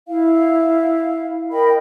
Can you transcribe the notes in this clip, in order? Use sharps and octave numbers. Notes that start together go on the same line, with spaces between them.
E4 F5
A#4 D#5 G5 B5